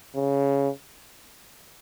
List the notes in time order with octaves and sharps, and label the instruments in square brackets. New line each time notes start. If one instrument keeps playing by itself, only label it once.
[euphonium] C#3